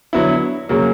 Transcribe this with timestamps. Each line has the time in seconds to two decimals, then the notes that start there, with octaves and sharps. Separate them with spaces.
0.13 D3 F#3 B3 E4
0.69 C#3 F#3 A#3